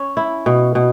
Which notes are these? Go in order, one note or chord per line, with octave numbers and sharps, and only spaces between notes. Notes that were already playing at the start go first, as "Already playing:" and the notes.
Already playing: C#4
E4
B2
B2